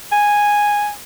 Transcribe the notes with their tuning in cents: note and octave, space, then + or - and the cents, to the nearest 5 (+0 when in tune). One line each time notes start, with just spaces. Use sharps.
G#5 -5